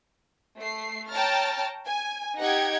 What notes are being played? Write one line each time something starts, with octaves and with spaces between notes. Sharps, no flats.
A3 C7
C#5 G5 A5 A#5 F6 A6
G#5
D#4 G4 D#5 F#5 G5 G#6